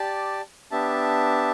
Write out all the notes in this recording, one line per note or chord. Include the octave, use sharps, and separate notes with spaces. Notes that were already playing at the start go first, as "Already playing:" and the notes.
Already playing: G4 D5 A5
B3 D4 G4 E5 A5